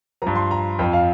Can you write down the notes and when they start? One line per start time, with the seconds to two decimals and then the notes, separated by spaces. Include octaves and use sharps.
0.22 G2 F3 A#5
0.35 C6
0.51 A#5
0.79 F2 F3 G5
0.93 F5